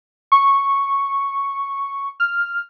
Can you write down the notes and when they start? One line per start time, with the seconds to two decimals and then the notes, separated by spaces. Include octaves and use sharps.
0.32 C#6
2.20 F6